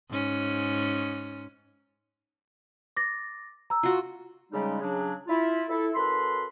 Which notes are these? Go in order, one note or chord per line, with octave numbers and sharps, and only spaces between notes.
G#2 C#4
D6 A6 A#6
A#5 E6
F4 F#4
C#3 G3 G#3 D#4
C#3 F#3 D4 G#4
E4 F4
E4 A4
F#2 A4 B4 B5 C6